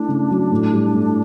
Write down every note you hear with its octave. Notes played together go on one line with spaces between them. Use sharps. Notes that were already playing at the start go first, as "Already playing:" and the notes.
Already playing: A3 D4 E4
C#3
F#3
A2
G3
A2